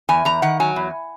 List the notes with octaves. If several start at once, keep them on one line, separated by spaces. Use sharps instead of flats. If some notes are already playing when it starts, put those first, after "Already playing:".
E2 G#5
E2 A#5
D#3 F#5
F#3 G#5
E2